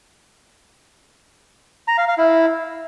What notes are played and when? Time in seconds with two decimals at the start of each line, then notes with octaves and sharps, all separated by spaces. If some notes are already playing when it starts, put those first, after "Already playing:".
1.88 A#5
1.98 F5
2.08 F5
2.18 E4